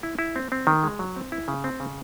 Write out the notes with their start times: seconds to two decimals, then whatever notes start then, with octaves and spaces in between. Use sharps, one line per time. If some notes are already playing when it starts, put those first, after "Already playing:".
0.03 E4
0.19 E4
0.36 C4
0.52 C4
0.67 D#3
0.83 G#3
0.99 F#3
1.16 C4
1.32 E4
1.48 C#3
1.64 C4
1.80 C#3